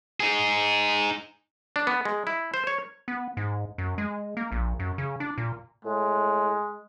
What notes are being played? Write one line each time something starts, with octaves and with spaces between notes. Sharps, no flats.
D#4 G#4
D4
B3
G#3
E4
C5
C#5
B3
G#2
F#2
G#3
A#3
A#1
F#2
C#3
D4
A#2
A2 G#3